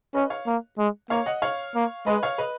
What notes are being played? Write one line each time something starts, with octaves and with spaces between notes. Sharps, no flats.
C#4 B4 D#5
C#5 F5
A#3
G#3
A#3 C#5 F5
D#5 F#5
C#5 F5
A#3
G#3 B4 D#5
C#5 F5
B4 D#5